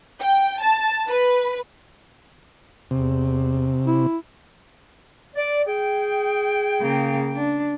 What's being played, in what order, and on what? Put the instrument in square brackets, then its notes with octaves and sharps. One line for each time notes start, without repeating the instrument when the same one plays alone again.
[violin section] G5
A5
B4
[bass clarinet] E2 [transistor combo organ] C3
[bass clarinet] E4
[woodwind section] D5
G#4 G5
[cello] C#3 A#3
D4